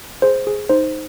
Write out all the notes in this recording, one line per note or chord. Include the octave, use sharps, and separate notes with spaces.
G#4 C5
G#4
D#4 C5